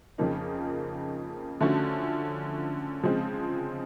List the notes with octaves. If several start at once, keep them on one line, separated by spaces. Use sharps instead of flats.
F2 C#3 F3 A#3 D#4
D3 F3 A3 C#4 F#4
C#3 F3 G#3 C4